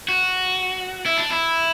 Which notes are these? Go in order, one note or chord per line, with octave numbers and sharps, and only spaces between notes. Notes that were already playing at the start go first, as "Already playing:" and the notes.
F#4
E4
D4
E4